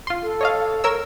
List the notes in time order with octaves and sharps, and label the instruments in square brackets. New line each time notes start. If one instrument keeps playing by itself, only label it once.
[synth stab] F4 C6
[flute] A4
[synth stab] C#5 D#5 F5
A#4 C#5 E6